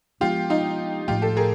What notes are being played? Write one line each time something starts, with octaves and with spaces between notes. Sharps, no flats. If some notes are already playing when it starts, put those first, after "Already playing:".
F3 G#3 B3 D4 F4 G4
D#4 F4
A2 F3 A3 F4 G4
G4 A4
G#4 A#4